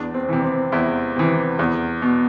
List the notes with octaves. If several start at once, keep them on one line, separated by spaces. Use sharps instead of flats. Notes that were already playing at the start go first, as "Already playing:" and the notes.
Already playing: E2 D4
C4
C3 E3
C4
E2 E4
C3 E3
E2
B2